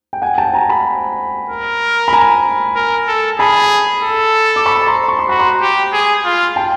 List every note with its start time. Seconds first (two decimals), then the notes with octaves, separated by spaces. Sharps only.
0.13 G5
0.22 F#5 G#5
0.38 G5 A5
0.54 G#5 A#5
0.69 A5 B5
1.49 A#4
2.08 B5
2.13 G#5 A#5
2.75 A#4
3.08 A4
3.39 G#4 A5 B5
4.03 A4
4.56 D6
4.66 B5 C#6
4.87 A#5 C6
5.08 C#6
5.19 C6
5.29 F#4 B5
5.39 A#5 C6
5.61 G4
5.93 G#4
6.25 F4
6.56 G5 A5